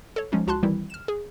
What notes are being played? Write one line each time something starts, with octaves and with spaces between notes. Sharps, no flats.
A4 C#5
F3 G#3 C#4 D#4
C#2 F#4 A5 C6 F#6
D#3 E3 G3 C4 E4
F6 E7
G#4